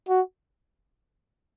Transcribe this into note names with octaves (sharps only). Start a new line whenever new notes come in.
F#4